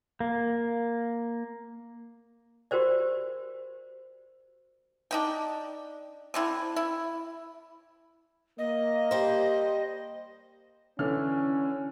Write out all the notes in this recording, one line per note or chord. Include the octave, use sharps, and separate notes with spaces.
A#3
F#4 G4 A#4 C5 D5
D4 D#4 G5
D3 C4 E4
E4
A#3 D#5
G3 C5
D3 E3 C#4 F6